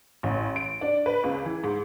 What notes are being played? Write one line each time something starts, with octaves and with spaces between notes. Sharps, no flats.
A1
D7
D4
B4
C#2
E3
G#2